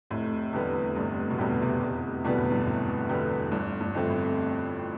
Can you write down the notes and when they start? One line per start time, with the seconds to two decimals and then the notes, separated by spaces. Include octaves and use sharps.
0.10 F1 A2
0.53 E2 D3 G3 B3
0.96 F1 G2
1.30 B2
1.38 E2 A2 D3 G3 B3
1.60 C3
1.81 F1
2.24 E2 B2 D3 G3 B3
2.38 A2
2.51 G2
2.66 F1 A2
3.09 E2 D3 G3 B3
3.52 G1 G2
3.81 G2
3.94 F2 D3 A3 C4
4.09 A2